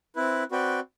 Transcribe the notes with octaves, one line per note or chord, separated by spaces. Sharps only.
C4 E4 B4
C4 F#4 B4 D5 G5